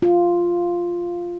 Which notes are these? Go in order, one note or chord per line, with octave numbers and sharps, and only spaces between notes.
F4